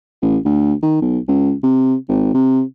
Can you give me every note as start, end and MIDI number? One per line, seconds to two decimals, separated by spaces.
0.22 0.37 33
0.45 0.73 38
0.82 0.97 51
1.02 1.18 35
1.28 1.53 37
1.63 1.94 48
2.08 2.33 32
2.34 2.61 48